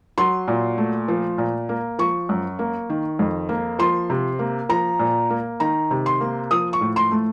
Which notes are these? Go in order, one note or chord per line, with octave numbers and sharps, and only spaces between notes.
F#3 C6
A#2
A3
F3
A#2
A#3
F3 C#6
F#2
A#3
D#3
F2
A#3
F3 C6
C3
A#3
F3 A#5
A#2
A#3
D#3 A#5
C3
C6
A#3
F3 D#6
C#6
A2
C6
A3